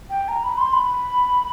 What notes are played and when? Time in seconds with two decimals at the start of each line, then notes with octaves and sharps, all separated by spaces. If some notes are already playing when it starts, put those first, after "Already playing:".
0.10 G5
0.28 A#5
0.44 B5
0.57 C6
0.73 B5